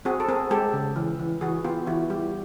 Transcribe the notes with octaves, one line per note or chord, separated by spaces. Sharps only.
C4 F#4 G#4
A4
C4 G#4 A#4
G#3 G4 A4
C#3
E3
E3
E3 F#4 G#4
B3 F4 G4
E3 E4 F#4
G3 F4 G4